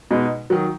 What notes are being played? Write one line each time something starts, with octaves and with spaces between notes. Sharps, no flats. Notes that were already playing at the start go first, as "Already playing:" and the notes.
B2 G#3 B3 D#4
D#3 F#3